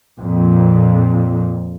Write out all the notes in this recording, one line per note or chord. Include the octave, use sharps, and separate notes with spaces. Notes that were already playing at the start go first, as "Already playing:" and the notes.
F2 A#2